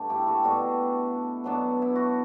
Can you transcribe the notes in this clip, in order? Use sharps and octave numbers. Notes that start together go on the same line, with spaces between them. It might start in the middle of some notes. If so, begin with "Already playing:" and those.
Already playing: G2 D3 A3 D4
E4 G4
F#4 A4
B2 G3 D4 F#4 A4
B2 F#3 B3 D4
E4
F#4